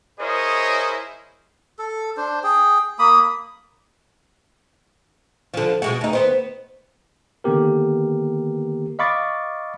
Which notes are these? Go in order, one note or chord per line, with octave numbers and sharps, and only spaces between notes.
E4 G#4 A#4 C5 C#5 D#5
A4
D4 C5
G#4 G5
A#3 B5 D#6
D3 F3
B2 G#3 F#4
D2 D#4
D#2 B3 C5
D3 D#3 A#3 B3 G4 A#4
D#5 F5 B5 C#6 D6 A6